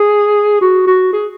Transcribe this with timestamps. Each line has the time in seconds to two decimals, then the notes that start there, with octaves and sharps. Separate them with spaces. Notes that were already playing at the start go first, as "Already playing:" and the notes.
Already playing: G#4
0.61 F#4
0.87 F#4
1.13 G#4